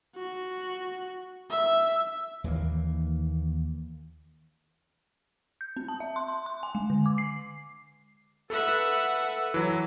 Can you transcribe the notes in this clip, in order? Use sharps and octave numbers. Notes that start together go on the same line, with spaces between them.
F#4
E5
D#2 E3 F#3 A#3
G6
C4
A5
E5
C6
C6
C6
G#5
G#3
D3
D6
C7
A4 B4 E5 F#5
E3 F#3